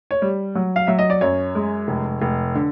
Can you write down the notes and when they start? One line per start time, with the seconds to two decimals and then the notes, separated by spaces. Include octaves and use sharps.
0.11 C#5
0.22 G3
0.55 F#3
0.76 F5
0.87 F#3 E5
0.99 D#5
1.10 D5
1.21 F#2 C#5
1.55 G#3
1.88 F1
2.22 F1
2.55 D3